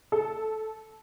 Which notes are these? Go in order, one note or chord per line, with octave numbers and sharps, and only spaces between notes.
A4